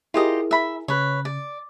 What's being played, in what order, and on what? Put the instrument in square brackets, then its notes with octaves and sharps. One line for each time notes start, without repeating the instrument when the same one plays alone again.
[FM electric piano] E4 G#4 A#4 [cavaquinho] F4 G4 D#5
[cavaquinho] E5 B5
[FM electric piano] C#3 [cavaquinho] B4 C#5
[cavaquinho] D5